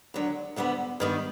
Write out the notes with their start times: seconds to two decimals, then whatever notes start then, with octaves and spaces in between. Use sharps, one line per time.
0.14 D#2 D3 F#3
0.56 D2 D3 G3 B3
1.00 G2 D#3 G3 B3 D#4